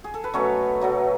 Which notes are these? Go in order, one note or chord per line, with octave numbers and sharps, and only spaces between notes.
G#4
A4
B4
B2 F#3 A3 C#4 C#5
B2 F#3 A3